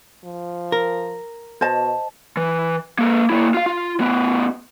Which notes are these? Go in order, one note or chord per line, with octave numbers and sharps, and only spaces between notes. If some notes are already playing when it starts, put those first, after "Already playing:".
F3
A#4
B2 C5 D#5 A5
E3
A#3 A4
A#3 E4
F4 F5
F4
A2 B3